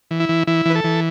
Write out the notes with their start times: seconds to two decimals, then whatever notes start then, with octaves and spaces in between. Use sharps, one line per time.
0.11 E3
0.20 E4
0.29 E3
0.47 E3 E4
0.65 E3 B4
0.75 A4
0.84 E3